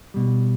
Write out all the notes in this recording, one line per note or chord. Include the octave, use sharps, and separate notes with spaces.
B2 G3